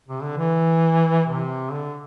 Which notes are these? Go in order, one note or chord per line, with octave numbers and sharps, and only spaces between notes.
C3
D3
E3
C3
D3